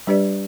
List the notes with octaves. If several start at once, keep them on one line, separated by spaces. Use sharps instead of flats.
G3 D4 G4 B4 D5